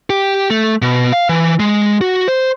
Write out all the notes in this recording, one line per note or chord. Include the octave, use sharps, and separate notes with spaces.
G4
A3
B2
F5
E3
G#3
F#4
C5